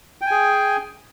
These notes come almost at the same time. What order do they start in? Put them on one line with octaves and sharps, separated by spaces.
G5 G#5 G#4